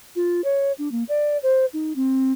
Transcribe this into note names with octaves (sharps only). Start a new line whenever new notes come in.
F4
C#5
D4
A#3
D5
C5
D#4
C4